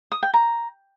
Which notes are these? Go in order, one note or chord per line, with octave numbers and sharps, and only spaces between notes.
D#6
G5
A#5